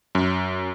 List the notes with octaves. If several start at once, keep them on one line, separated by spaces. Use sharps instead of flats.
F#2